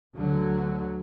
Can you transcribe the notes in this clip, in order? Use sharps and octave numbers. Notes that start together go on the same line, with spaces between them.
D2 D3 F#3